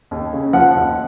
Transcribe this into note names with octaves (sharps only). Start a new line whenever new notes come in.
D#2
C#3
F3 F#5
D#2